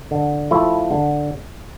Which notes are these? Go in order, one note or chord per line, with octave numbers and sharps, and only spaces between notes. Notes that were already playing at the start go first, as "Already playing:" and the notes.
D3
F3 A3 E4 A4
D3